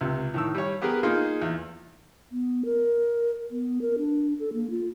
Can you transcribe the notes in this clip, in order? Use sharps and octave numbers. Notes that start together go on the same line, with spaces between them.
C#2 C3
A2 D#3 E6
G3 C#5
B3 G4 G#4 A#4 B4
A#3 D#4 F4 G#4
E2
B3
A#4
B3
A#4
D4
A4
A#3
F4